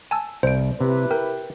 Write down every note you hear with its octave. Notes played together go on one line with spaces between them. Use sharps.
G#5 A5 E6
C2 C5 D7
C3 E4 G4 B4
A#4 G5